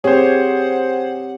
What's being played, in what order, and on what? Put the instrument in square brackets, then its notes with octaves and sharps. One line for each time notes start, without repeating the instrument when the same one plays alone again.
[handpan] C4 G4 C#5 [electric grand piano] G#4 C5 [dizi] F#5